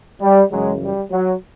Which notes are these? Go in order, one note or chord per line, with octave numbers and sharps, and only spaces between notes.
G3
F#2 C#3 E3 F#3 G#3
G3
F#3